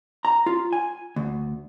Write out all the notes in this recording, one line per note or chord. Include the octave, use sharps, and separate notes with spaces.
A#5
F4
G#5
D2